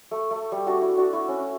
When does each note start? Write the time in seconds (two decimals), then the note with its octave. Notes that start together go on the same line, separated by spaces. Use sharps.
0.11 A3
0.31 A3
0.52 G3
0.66 D4 F#4
0.82 E4
0.97 D4 F#4
1.13 E4
1.28 C#4